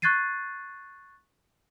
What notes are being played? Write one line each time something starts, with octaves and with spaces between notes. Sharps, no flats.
C#6 F#6 G#6 A6 C7 D#7